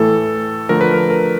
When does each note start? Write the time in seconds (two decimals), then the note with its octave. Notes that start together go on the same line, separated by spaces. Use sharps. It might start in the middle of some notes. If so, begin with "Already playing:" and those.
Already playing: A2 E3 A3 A4
0.69 D3 F3 A3 A#4
0.81 B4
0.94 A#4
1.10 A#4